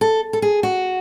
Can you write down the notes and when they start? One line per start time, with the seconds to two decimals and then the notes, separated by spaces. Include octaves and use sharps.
0.01 A4
0.33 A4
0.42 G#4
0.63 F#4